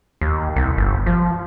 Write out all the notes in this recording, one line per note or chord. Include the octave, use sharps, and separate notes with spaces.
D#2
C2
G1
F3